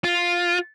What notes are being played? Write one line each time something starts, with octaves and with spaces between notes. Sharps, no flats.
F4